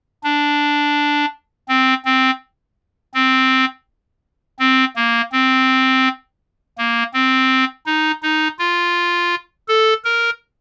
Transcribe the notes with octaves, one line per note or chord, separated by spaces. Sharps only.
D4
C4
C4
C4
C4
A#3
C4
A#3
C4
D#4
D#4
F4
A4
A#4